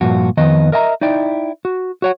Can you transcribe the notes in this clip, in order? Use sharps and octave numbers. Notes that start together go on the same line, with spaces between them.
G2 A#2 F3 F#4
F2 D#3 B3 D#5
A#4 D#5 E5 A5 A#5
D#4 E4 D5 G5
F#4
F#4 C#5 F#5